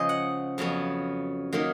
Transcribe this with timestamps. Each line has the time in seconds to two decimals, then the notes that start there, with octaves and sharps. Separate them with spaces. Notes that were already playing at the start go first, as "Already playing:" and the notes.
Already playing: C#3 F3 G#3 D#5
0.09 F#5
0.58 F2 C#3 F#3 B3
1.53 D#3 F#3 A#3